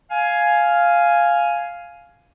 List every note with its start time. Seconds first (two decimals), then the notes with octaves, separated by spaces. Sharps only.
0.11 F5 G#5